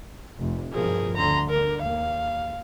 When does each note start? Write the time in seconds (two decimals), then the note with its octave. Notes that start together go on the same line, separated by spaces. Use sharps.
0.39 F1
0.72 G2 B2 F3 G#4 A#4
1.17 D2 D3 A#5 C6
1.50 D3 A#4
1.82 D#2 A#3 F5